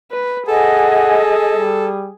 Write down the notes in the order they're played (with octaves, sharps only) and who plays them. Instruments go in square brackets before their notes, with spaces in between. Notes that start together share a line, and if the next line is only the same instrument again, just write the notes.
[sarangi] B4
[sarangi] G#4 [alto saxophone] A4 [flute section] D#5 G#5 [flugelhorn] F#5
[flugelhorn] G3